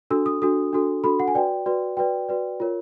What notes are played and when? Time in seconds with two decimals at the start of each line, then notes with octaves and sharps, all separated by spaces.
0.10 D4 F#4 A4 E6
0.26 D#6
0.42 D4 F#4 A4 D#6
0.73 D4 F#4 A4
1.04 D4 F#4 A4 B5
1.20 F#5
1.28 G#5
1.35 F#4 B4 D5 G5
1.66 F#4 B4 D5
1.97 F#4 B4 D5 G5
2.29 F#4 B4 D5
2.60 F4 A#4 C#5